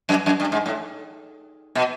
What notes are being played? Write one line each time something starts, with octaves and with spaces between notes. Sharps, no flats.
F#2
F#2
G2
G#2
A2
B2